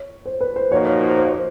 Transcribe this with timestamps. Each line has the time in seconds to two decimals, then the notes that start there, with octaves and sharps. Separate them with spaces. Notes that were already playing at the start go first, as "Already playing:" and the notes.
Already playing: C#5
0.26 C5
0.41 B4
0.56 C5
0.71 A#2 F3 A#3 D#4 F#4 C#5
0.87 C#5
1.02 C5
1.17 C5
1.25 C#5
1.32 C5